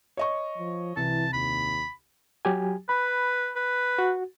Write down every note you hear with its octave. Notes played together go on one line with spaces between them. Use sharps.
C#5 D#5 C#6
F3
C2 E3 A5
D#2 B5
F#3 G4 G#5
B4 B5
B4
F#4